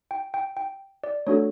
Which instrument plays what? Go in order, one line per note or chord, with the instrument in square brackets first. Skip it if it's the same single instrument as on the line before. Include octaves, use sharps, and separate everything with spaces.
[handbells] G5
G5
G5
D5
A3 D4 F#4 A4 C#5